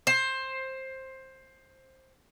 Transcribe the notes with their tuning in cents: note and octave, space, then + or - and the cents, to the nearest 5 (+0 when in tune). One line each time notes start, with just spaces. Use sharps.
C5 +15